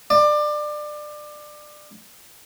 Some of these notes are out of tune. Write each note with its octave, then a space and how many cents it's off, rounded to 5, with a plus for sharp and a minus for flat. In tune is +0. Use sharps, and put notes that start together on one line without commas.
D5 +25